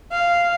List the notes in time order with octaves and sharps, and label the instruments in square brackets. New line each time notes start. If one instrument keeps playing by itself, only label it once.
[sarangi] F5